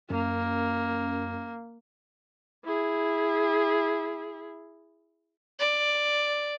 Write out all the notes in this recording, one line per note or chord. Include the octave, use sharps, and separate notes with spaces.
F#2 A#3
E4 G#4
D5